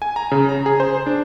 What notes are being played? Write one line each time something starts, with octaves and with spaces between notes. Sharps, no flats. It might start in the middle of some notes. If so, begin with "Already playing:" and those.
G#5
A#5
C#3
A#5
G#4
C5
D4